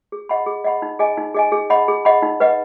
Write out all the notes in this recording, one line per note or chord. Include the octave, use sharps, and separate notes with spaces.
G#4
D#5 F#5 B5
G#4
D#5 F#5 B5
D#4
G#4 D#5 G#5
D#4
G#4 D#5 G#5
G#4
D#5 F#5 B5
G#4
D#5 F#5 B5
D#4
B4 D#5 F#5